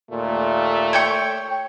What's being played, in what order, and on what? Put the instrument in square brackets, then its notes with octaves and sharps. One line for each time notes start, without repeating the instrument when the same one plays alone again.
[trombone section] D#2 A#2 [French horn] A3
[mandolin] C#5 G5 C#6